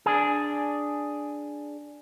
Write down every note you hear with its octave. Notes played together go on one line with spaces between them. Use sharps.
D4 G#4